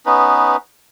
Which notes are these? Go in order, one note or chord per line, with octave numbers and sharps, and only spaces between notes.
B3 C#4 D#4 B4